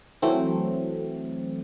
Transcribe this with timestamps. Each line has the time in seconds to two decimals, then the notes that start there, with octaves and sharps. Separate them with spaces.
0.22 E3 F#3 A3 C4